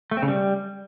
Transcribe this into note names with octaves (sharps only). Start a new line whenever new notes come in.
A3
C4
C#3
G3